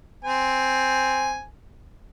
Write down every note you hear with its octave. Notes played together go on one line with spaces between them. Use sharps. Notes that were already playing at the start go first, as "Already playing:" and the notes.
C4 G#5